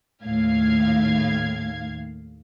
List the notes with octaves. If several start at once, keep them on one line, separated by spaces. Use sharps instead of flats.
D#2 A2 F5 G#6